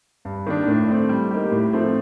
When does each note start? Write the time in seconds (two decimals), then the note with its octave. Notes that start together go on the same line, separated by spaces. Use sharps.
0.25 G2
0.46 D#3 A#3 D4
0.67 A2
0.88 A3 C4
1.09 G3
1.31 A#3 D#4 G4
1.52 A2
1.73 F3 A3 C4